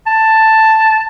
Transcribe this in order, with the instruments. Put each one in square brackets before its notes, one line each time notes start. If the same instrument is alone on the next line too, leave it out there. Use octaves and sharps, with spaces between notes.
[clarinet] A5